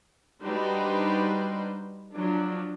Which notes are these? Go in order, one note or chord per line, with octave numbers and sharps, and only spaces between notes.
G3 D4 D#4 F#4 B4 C5
F3 F#3 D4